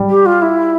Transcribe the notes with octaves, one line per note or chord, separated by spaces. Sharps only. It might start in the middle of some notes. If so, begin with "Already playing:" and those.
Already playing: G3
G4
F4
E4